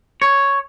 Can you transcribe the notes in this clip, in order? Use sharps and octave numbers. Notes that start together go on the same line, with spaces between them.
C#5